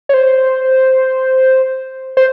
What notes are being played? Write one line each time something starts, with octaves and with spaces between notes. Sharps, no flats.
C#5
C5
C5